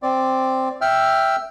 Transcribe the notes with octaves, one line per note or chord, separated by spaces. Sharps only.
C4 D5
E5 G5 E6 F6